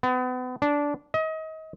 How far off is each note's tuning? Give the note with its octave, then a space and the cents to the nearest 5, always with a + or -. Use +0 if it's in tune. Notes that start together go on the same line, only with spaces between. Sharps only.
B3 +35
D4 -15
D#5 +30